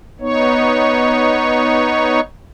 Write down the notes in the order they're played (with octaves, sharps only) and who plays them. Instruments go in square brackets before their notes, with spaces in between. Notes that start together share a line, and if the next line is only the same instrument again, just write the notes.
[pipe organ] B3 D#4 C#5